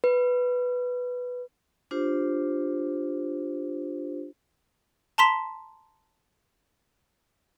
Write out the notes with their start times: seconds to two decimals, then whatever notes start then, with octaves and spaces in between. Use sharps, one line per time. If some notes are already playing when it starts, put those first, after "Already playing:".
0.04 B4
1.91 D4 F4 G4 C5
5.18 A5 A#5 C6 B6 E7